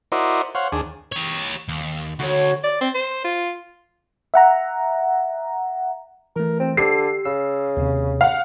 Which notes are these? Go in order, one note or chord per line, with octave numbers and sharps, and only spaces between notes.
E4 F#4 A#4 C5 D5 D#5
C5 C#5 F5 F#5
D#2 D4 G#4
G4 C#5
D#2
D2 F#4 C#5
D5
C4
C5
F4
E5 F#5 A#5
E3 A3 A#4
C4
D3 G4 E6 C7
C#3 E6
D#2 C3
F5 F#5